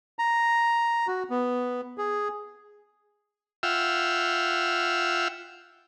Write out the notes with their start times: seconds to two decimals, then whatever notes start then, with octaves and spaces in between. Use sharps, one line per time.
0.19 A#5
1.07 F#4
1.30 B3
1.98 G#4
3.63 F4 E5 F#5 G5 E6 F6